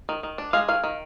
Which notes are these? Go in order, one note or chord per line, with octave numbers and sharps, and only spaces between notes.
D#3
D#3
D4
G#3 F5
D#3 F5
D#3